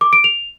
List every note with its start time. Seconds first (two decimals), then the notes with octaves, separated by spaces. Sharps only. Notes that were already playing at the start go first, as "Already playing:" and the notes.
0.01 D6
0.13 D7
0.24 F7